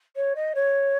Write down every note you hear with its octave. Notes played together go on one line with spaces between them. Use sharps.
C#5
D#5
C#5